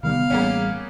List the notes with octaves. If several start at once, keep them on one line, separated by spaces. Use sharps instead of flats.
C3 D#3 G3 B3 F5
A1 G3 A#3 B3 C#4 G#4